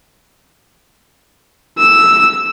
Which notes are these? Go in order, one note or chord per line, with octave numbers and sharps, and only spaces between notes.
E6